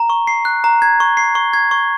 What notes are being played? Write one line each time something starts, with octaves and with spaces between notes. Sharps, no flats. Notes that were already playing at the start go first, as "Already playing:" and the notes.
Already playing: A#5
C#6
C7
F#6
A#5
G#6
C#6
C7
C#6
G#6
C#6